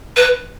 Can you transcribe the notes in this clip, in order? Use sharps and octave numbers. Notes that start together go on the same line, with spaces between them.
B4